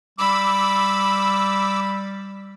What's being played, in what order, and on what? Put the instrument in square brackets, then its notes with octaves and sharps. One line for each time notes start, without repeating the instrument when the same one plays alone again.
[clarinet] G3 [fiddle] B5 [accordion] D6 E6